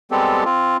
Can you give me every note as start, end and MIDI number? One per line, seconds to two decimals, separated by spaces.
0.11 0.44 55
0.11 0.44 56
0.11 0.44 59
0.11 0.44 60
0.11 0.44 67
0.11 0.44 69
0.45 0.77 60
0.45 0.77 65